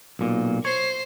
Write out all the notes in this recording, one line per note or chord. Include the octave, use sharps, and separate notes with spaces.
B1 A#2
C5 C#5 C7